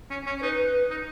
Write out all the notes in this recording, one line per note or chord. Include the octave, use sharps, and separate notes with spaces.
C#4
C#4
C#5
D#4 B4
D#4